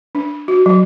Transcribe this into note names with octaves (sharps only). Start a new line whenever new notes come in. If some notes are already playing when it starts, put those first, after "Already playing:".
D4
F#4
F#3